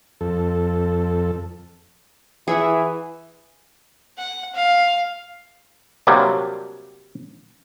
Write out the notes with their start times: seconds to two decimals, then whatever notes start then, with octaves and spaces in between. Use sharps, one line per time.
0.21 F2 A4
2.48 E3 G#4 E5 F#5
4.18 F#5
4.55 F5
6.07 C3 F#3 G3 A#3 D4